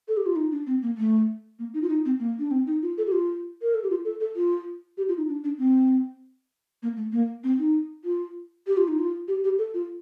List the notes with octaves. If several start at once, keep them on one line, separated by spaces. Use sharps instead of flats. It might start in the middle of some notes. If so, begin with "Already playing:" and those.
A4
G4
F4
D#4
D4
C4
A#3
A3
A#3
D#4
F4
D#4
C4
A#3
D4
C4
D#4
F4
A4
G4
F4
A#4
A4
G4
F4
A4
A4
F4
G4
F4
D#4
D4
D4
C4
A#3
A3
A#3
C4
D#4
F4
G4
F4
D#4
F4
G4
G4
A4
F4